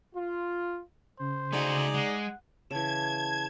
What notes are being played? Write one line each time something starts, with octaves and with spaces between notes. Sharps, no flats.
F4
C#3 C5
A3 D#4 F#4 G#4 D5
G#3 F#5
C#3 E3 A5 G#6